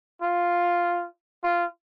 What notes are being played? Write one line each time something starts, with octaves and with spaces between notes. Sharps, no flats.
F4
F4